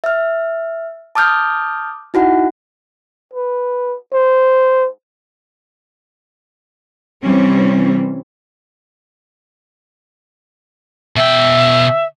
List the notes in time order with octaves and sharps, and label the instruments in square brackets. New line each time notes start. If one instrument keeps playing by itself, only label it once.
[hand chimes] E5 F6
A5 D6 D#6 F6 G6
D#4 E4 F#4 F#5
[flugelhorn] B4
C5
[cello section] C3 E3 G3 C4 C#4
[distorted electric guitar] B2 G5 [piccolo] E5